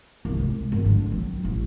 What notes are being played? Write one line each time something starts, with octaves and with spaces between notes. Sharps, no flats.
C2
G#3
G#1 F#3
D3 G#3
F#3 C4
A1